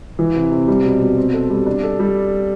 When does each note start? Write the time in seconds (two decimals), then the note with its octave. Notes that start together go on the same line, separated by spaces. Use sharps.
0.19 E3
0.34 C3
0.51 C3
0.68 G3
0.85 B2
1.01 B2
1.17 C4
1.33 A4
1.50 G3
1.66 D4
1.83 A4
1.99 G3